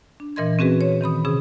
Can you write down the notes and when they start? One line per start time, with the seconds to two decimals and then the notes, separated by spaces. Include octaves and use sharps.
0.20 D4
0.36 A#2 E3 A#4 D#5 C6 G#6
0.59 C4 C#4 F#4 G#4 B4
0.81 C#5
1.01 D#3 C4 B5 D#6
1.25 C3 C#4 G#4 D#6